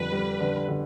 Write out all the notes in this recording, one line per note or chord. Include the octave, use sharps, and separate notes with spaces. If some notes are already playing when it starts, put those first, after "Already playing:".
Already playing: F2 D3 G3 B4
G3
D3
D3